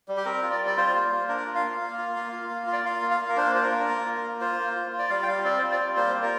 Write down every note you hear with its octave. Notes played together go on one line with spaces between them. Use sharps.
G3
G4
C4 A#4
F4
D5
G3
D5
F4 C5
A#3
A#3
D4 A#4
F4
F5
A#3
A#3
F4
A#3
F4
A#3
F4
D5
F4 F5
A#3
F5
A#3
A#4
D4 C5
F4 C5
A#4
A#3
A#3
F4
A#3
F4 C5
A#3
F4
F4
D5
G3 F5
G5
G3 F5
C4 D5
F4 C5
D5
G3
A#3 C5
F4
A#4